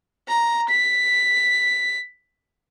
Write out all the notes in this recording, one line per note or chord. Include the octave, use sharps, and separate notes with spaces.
A#5
B6